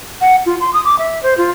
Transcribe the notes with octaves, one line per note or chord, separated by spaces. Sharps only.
F#5
F4
C6
D#6
D6
E5
C5
F4